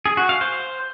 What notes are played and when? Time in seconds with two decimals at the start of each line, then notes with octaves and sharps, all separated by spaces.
0.06 G#4
0.17 F#4
0.29 F5
0.41 C5